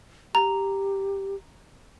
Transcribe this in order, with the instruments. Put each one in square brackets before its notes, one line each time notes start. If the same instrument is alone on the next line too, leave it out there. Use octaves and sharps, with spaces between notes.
[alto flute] G4 [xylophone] A#5